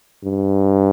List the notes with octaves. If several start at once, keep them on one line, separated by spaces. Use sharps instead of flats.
G2